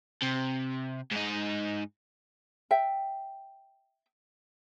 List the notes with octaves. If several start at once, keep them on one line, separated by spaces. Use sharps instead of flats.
C3
G#2 D#4
E5 G5